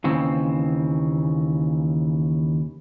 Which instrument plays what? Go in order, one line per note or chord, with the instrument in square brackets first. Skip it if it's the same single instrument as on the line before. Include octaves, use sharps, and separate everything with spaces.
[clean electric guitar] D#2 C#3 E3 C4